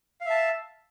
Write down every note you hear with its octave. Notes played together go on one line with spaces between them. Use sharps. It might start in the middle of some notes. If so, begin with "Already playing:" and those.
E5 F5 A5